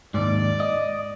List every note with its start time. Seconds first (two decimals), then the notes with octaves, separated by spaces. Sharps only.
0.14 D#2 G#2 D5
0.60 D#5